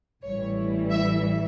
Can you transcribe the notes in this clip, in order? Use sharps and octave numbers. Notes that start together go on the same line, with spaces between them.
A1 A2 E3 G3 C#5
E5